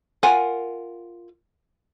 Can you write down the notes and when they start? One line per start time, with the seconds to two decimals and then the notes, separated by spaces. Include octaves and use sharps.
0.23 F4 A#4 F#5 G#5